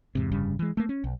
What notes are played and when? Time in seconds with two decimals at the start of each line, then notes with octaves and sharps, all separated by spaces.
0.15 E2 G#2 C3
0.31 F1 G2 C#3 G3
0.59 E3 G#3
0.77 A3 A#3
0.89 C#4
1.04 B1